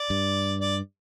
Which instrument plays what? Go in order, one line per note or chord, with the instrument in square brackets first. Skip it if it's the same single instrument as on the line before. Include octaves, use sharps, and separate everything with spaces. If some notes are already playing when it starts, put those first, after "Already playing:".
Already playing: [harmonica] D5
[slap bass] G2
[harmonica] D5